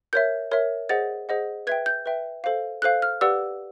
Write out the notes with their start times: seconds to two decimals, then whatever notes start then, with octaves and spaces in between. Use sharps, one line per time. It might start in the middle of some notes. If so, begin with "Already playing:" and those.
0.13 A#4 C#5 E5 G6
0.51 A#4 C#5 E5
0.89 G#4 C5 D#5 F#5 A6
1.29 G#4 C5 D#5 F#5
1.67 B4 E5 G5 G#6
1.86 G6
2.06 B4 E5 G5
2.44 A4 C5 F5
2.82 A4 C5 F5 F#6
3.02 F6
3.21 G4 B4 D5 F#5 E6